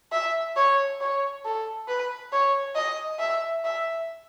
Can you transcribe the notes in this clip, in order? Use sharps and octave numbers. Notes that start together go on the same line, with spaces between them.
E5
C#5
C#5
A4
B4
C#5
D#5
E5
E5